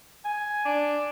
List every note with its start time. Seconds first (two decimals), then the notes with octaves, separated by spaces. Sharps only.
0.25 G#5
0.65 D4